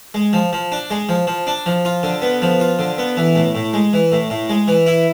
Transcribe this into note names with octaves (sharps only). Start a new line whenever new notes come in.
G#3
F3
F3
D4
G#3
F3
F3
D4
F3
F4
D3
B3
F3
F4
D3
B3
E3
A2
A2
G#3
E3
A2
A2
G#3
E3
E4